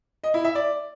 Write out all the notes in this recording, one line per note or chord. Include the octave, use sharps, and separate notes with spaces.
D#5
E4
E5
D5